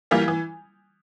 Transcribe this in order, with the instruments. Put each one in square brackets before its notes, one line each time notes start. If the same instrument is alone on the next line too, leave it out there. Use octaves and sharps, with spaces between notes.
[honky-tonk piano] E3 G3 A#3 F4
E3